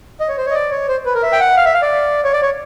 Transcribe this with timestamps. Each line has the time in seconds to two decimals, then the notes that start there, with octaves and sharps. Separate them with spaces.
0.20 D#5
0.29 C#5
0.38 C5
0.46 C#5
0.51 D#5
0.55 D5
0.71 C#5
0.88 C5
1.06 B4
1.15 A#4
1.23 E5
1.33 G5
1.40 F#5
1.57 F5
1.66 E5
1.74 F5
1.82 D5
2.24 C#5
2.33 D5
2.42 C#5